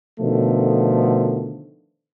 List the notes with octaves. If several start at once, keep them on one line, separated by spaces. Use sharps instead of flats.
B2 D3 D#3 F3 A3